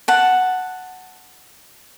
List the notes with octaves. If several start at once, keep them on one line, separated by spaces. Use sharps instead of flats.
F#5 A5